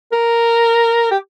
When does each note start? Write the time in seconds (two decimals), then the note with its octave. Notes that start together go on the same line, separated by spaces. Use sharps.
0.12 A#4
1.11 G4